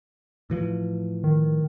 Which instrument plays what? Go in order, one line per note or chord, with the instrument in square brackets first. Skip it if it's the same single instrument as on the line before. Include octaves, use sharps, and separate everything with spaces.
[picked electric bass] A2 E3 F3
[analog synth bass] D#3